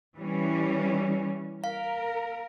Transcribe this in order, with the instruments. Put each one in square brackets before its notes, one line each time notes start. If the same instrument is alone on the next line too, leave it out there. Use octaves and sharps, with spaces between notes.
[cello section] E3 G3 C#4
[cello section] A#4 [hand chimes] F5